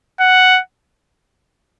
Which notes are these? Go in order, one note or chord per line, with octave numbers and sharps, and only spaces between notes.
F#5